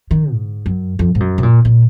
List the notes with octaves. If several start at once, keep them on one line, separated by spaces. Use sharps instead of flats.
D#3
G#2
F#2
F2
G#2
F#2
C3
A#2
A#2